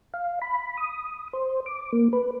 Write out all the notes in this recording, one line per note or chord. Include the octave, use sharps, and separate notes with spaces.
F5
B5
D#6
C5
D6
A#3
B4